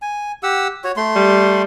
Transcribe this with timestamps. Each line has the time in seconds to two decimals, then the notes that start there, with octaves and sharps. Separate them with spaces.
0.02 G#5
0.43 G4 F#5 E6
0.84 F#4 C#5
0.97 A3 C6
1.16 G3